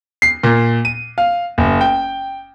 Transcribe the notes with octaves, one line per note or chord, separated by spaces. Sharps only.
C7
A#2
D#7
F5
F#1
G5